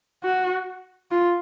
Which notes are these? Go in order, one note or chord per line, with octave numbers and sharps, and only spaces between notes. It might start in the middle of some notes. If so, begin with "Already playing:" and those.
F#4
F4